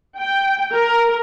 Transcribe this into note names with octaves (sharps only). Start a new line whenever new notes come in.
G5
A#4